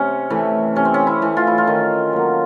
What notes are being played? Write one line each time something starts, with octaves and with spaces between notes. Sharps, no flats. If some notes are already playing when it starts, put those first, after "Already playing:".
Already playing: C3 C#4
E3 A3
C3 C#4
C4
C#4
E4
E3 A3
F4
E4
F4
D#3
F#3 A#3